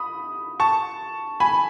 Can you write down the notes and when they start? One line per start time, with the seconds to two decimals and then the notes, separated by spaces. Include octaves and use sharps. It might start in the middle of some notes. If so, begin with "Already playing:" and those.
Already playing: B5 D#6
0.60 A5 C#6
1.40 G#5 B5